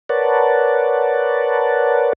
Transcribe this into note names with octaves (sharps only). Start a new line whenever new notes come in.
A#4 B4 C#5 D5 F#5 A5